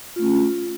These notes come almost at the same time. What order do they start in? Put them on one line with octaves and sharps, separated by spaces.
F4 A3 C#4